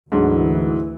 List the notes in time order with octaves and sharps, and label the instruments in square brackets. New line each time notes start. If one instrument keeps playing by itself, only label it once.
[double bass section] D2 E3 [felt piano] G#2 D3 F#3